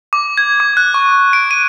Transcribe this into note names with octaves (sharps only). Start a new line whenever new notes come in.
D6
G#6
D6
F#6
C#6
D7
D#7